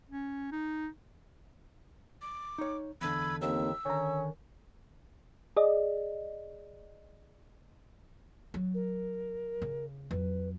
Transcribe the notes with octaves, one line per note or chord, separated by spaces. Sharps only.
C#4
D#4
D6
D#4 C#5
E2 D3 B5 E6 G#6
D#2 A#3 C4 D#4 E6
D3 D#3 C#4 A#5
G#4 D5 D#5
F#3
A#4
C#3
F2 F#3 B4